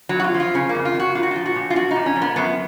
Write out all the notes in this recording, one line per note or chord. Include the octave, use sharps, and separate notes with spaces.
F2 F#3
F#4
F4
F3
F4
C#3 C#4
A#3
F2
F4
F2 F#4
A#2 F4
F#4
F3 F4
F#4
A#2
F4
F3 F#4
A#2 D#4
C#4
F3
B3
F#2 B3